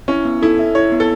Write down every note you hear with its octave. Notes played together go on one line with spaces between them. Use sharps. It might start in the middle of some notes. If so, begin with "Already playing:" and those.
C#4 E4
B3
E4 A4
E5
E4 C#5
B3
A4